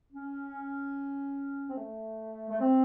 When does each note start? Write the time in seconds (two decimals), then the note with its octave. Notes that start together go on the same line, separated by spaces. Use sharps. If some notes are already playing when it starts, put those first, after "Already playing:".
0.11 C#4
1.68 C4
1.77 A3
2.50 A3
2.60 C4